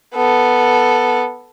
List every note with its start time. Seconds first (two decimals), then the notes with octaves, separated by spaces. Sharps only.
0.14 B3 A4